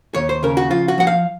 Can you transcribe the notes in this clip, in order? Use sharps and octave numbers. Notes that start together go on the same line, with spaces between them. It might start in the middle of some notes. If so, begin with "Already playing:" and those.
D#2 C#5
C5
C#3 A#4
F#4
F3 F4
F#4
F3 F#5
F5